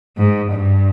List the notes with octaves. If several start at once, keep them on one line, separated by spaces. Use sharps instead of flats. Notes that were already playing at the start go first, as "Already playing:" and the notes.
G#2
G2